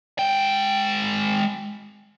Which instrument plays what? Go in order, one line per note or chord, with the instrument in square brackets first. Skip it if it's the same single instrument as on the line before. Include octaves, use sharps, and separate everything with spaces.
[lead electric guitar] G#3 G5